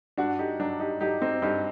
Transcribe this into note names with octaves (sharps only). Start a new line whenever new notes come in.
G2 D4 F#4
D#4 G4
F#3 D4 F#4
D#4 G4
F#3 D#4 G4
C4 D#4
G2 D#4 G4